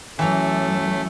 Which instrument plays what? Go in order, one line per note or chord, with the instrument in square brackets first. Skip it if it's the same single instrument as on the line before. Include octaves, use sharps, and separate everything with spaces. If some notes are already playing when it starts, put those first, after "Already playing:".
[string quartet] F#2 [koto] E3 A#5 [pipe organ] A3